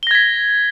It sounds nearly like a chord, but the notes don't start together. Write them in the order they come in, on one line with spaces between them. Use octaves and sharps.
G7 A#6 G#6 B6